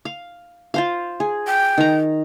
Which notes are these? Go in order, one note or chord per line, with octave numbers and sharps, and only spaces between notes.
F5
F4 C5 F5
G#4
G5
D#3 A#5